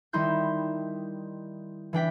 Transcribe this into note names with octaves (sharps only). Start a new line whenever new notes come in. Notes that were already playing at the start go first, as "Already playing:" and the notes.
D#3 G3 D#4 E4 C6 G6
E3 D4 G5 B6